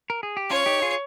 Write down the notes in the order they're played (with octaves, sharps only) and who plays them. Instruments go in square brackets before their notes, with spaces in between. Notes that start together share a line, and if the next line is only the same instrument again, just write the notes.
[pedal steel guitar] A#4
G#4
G4
[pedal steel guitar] C#4 F4 [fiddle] C#5
[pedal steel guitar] D#4 G4
F4 G#4